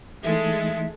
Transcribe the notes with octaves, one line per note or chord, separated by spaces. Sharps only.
E3 G#3 A3 D#4 A4 E5